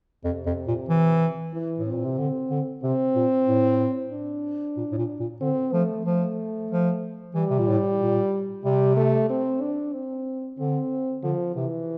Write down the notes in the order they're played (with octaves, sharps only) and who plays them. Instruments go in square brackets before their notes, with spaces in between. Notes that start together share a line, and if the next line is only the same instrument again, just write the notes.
[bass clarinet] F2 [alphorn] C3
[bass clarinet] F2
A#2
E3
[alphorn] E3
[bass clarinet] A2
[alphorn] C4
[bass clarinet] A#2
C3
D3
D3
[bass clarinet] C3 [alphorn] C4
[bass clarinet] A#2
A2
[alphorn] D4
[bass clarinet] A#2
A2
A#2
A#2
[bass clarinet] D3 [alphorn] C4
[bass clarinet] F3 [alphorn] A3
[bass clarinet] F3 [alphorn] A3
[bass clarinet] F3
[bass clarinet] E3 [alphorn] G3
[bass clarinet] C3
A#2
A2
A#2
[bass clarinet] C3 [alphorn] G3
[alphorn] A3
C4
D4
C4
[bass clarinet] D3 [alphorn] C4
[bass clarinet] D3 [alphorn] F3
[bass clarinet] C3 [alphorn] E3